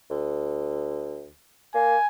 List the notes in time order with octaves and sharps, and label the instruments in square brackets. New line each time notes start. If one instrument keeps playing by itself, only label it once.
[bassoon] D2
[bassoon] A#3 [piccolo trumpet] G#5